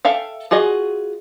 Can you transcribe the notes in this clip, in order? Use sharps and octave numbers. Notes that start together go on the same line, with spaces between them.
A4 E5 F5 G5
F4 F#4 G#4 D#5